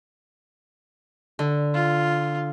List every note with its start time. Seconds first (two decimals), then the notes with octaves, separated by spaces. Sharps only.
1.39 D3
1.74 F4